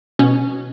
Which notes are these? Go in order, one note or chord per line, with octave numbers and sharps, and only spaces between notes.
B2 C#4